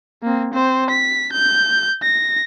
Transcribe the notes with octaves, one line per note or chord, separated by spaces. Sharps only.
A#3 C4
C4 C5
B6
G6
A#6